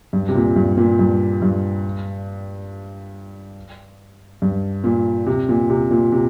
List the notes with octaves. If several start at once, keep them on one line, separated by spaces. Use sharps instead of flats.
G2
C3
A#2
G2
A#2
G2
G2
G2
A#2
C3
A#2
C3
A#2
C3